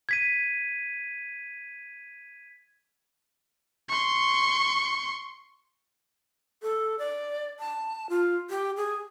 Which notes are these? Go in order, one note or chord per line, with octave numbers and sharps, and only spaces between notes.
G#6 B6 D#7
C6 C#6
A4
D5
A5
F4
G4
G#4